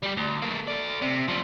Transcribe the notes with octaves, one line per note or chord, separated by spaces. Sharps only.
G3 G4
D2
A#3 A4
A3 D5
C3
F3 G3